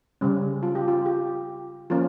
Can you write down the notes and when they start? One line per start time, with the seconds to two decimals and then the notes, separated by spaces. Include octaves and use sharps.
0.21 C#3 G3 C#4
0.63 F4
0.75 G4
0.88 F4
1.06 G4
1.90 F3 A#3 C#4 F4